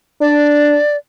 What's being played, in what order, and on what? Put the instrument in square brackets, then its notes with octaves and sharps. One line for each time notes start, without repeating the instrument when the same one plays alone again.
[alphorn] D4 [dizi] D5